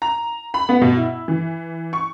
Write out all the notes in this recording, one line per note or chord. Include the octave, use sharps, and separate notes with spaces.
A#5
B5
B3
B2
E4
E3
C#6